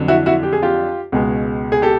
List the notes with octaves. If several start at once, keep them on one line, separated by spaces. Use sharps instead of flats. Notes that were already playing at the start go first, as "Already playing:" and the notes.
Already playing: F2 D3 F#3
E4 F#4
E4 F#4
G4
G#4
F4 G4
C#2 B2 G#3
G#4
G4 A4